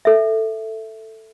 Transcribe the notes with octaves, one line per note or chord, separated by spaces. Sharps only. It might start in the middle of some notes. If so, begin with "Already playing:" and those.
A4 E5